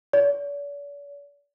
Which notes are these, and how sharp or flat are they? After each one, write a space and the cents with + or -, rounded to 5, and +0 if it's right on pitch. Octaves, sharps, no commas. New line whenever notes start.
D5 -45